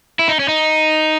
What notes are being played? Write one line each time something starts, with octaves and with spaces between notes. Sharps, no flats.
E4
D#4
C#4
D#4